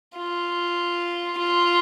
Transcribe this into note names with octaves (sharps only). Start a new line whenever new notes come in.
F4
F4